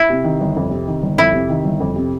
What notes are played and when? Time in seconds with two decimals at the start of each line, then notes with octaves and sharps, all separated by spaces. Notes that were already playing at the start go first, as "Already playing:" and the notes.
Already playing: E4
0.10 C3
0.24 D#3
0.41 G1
0.56 F2
0.71 C3
0.88 D#3
1.03 G1
1.18 F2 E4
1.34 C3
1.50 D#3
1.65 G1
1.80 F2
1.96 C3